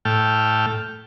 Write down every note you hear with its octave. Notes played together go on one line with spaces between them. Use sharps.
A2 G5 A5 F6